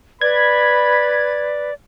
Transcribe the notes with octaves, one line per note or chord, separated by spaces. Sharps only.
B4 D5 B5 G#6